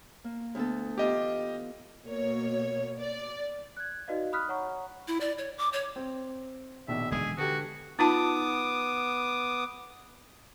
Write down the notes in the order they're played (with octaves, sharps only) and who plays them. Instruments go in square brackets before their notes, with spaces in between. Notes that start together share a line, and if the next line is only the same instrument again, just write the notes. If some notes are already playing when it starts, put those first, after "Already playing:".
[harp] A#3
D2 B3 A4
[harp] E3 B3 F4 [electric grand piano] G4 D#5
[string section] B2 A#3 C#5
D5
[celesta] F#6 G#6
D#4 F#4 B4 D5 D#5 F5
B5 D#6 F6 F#6 B6
C#5 F#5 A#5 C#6
[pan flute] E4
D5
C#5
D6
C#5
[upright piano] C4
[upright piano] A#1 B2 D#3 [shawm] E5
[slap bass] E1 D3 G#3 [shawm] G#4
[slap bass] D3 [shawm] F#4 [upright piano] G4 A4 B4
[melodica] B3 D6 D#6 [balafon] D#4 F4 A5